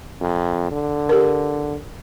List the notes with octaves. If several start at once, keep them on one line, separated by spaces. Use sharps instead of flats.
F2
D3
G4 A#4